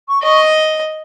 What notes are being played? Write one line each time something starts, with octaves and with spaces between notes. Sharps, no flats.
C#6
D#5 C#6